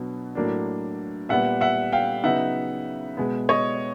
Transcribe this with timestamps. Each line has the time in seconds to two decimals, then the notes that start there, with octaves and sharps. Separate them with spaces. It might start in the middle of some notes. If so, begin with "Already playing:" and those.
Already playing: B2 F#3 B3 D4
0.35 A2 F#3 A#3 D4
1.29 A#2 G3 B3 E5 F#5
1.61 E5 F#5
1.92 F5 G5
2.24 C#3 F#3 B3 D#4 E5 F#5
3.17 B2 G#3 B3
3.49 C#5 D#5